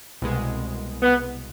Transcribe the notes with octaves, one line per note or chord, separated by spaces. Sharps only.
C2 B2 G#3
B3